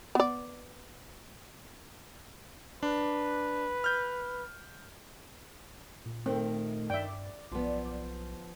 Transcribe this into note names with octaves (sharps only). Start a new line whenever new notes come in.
B3 D5
D4 B4
F6 G6
A#2
D#3 A3 C4
G2 D5 E5 G5
B1 F3 B3